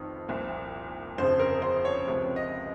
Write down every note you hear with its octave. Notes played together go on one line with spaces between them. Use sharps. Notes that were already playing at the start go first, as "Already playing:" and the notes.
Already playing: F1 F2 D#3
C2 A#2 F3
G1 F2 C#3 F3 C5
A#4
C5
C#5
C#2 C3 F3
D#5